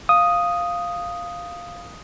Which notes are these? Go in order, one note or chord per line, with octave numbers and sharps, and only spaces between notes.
F5 D#6